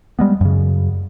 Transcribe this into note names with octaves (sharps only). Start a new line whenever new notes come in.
G3 G#3 B3
F#2 C#3